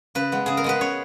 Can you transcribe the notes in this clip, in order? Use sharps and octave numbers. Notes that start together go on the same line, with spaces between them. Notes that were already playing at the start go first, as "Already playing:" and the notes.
C#3 B4
G#3 B3
C#3 G#4
A#4
G#3 B3 B4
C#5